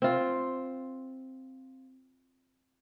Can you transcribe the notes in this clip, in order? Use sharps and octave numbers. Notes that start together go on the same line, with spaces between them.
C4 F4